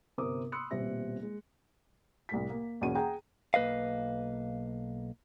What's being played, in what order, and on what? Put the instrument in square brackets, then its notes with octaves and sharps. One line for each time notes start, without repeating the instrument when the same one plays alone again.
[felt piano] G1 C3 C4 A#4 D6 D#6
B5 C6 D#6 E6 F#6 C#7
D#1 B2 G3 C4 E5 A#6
G#3
C2 A2 B6
A#3
B1 E2 B2 A#3 C#4 D#7
G#4 F#5 G5 A#5
[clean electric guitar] B1 A#3 B4 D#5 F5